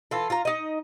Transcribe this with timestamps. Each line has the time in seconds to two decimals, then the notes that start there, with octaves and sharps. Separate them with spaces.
0.11 E3 F4 A4
0.30 F4 A#5
0.45 D#4 D#5